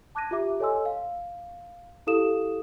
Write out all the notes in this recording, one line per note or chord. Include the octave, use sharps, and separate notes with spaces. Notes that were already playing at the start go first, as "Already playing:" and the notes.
A5 D6 F#6 G#6 A#6 D#7
F4 G4 E5 D6
A4 C#5 D#5 G#5 C6 E6
F5
E4 G4 A4 F5 D#6 E7